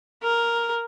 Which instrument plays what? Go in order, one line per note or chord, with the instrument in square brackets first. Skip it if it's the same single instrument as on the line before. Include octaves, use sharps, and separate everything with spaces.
[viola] A#4